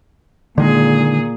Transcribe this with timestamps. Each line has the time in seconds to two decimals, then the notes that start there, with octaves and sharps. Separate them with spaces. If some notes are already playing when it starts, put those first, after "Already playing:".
0.58 A#2 D3 D#3 G#3 G#4